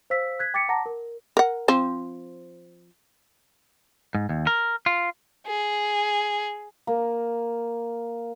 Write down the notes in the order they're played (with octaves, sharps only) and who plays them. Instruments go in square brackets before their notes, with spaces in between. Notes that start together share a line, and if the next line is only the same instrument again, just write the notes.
[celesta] C5 F5 E6 B6
F#6 G#6 B6
G5 D6 A6 B6 C#7
F#5 A5 A#5 D6 A#6
A#4
[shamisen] A#4 F#5
F3 C4 C5
[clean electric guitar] G#2
D#2
A#4
F4
[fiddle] G#4
[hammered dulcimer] A#3